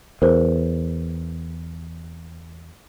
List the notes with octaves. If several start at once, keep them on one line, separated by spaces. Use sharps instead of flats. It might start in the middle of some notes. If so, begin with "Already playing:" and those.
E2 A#4 C5